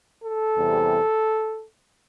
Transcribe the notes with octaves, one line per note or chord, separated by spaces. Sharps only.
A4
E2 C3 E3 G3 C4